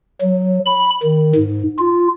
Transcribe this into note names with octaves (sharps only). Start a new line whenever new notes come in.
F#3
B5
D#3
G#2
F4